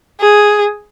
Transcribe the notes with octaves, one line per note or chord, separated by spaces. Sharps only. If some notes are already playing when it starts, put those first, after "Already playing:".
G#4